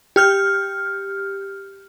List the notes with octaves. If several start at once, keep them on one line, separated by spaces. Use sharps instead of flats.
G4 F6 G6